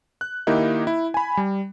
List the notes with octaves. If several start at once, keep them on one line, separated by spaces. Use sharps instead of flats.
F#6
D#3 A#3 D#4 E4 G4
E4
G#5 B5
G3